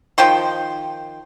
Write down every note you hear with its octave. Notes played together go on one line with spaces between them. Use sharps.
D#3 F3 G5 C6